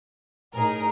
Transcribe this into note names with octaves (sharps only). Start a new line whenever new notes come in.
A2 D#4 G#4 A#4